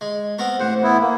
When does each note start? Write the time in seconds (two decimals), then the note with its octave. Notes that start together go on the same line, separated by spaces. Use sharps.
0.01 G#3
0.38 B3 C4 A#4
0.60 A1 C5 F#5
0.83 B3 E4
1.01 A#3